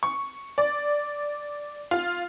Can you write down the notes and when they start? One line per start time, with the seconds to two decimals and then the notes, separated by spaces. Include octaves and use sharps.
0.03 C#6
0.58 D5
1.91 F4